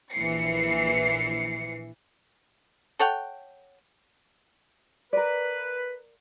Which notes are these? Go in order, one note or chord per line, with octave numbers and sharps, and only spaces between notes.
A#1 E3 C7 C#7
A4 C#5 F#5 G5
A#4 B4 D5